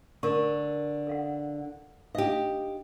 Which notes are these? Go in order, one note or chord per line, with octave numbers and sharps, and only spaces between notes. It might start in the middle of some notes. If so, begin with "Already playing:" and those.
D3 A#4 C#6
A4 F5 F#5
D4 D#4 G4 D#5 F5